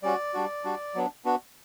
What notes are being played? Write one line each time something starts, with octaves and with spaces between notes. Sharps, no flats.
G3 C#4 F#4 D5
G3 D4 F#4
G3 D4 F#4
F#3 B3 D4
B3 D4 F#4